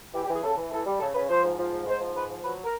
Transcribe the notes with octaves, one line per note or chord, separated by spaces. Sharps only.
E3 G4
G4
E3 G#4
C#3 A4
E3
E3 A4
G3
C#3 A4
C#3 B4
F3 C5
G#2
F3
G#2
G#2 C5
F3
G#2 B4
F3
F#3 B4
A#4